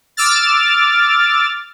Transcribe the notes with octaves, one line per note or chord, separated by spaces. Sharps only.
D6 E6 F6 A6